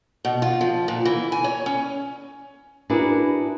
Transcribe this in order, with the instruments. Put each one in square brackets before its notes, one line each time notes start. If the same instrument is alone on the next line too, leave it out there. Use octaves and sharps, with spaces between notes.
[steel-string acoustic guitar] B2
F4
F3
A#2
E3
G#5
C#5
C#4
[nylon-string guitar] D4 E4 F#4 G#4 A#4 B4